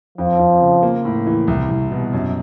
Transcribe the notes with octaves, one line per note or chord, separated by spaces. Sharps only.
F2 F3
F2
C#3
A#3
A2
E3
C2
C2
B2
F#2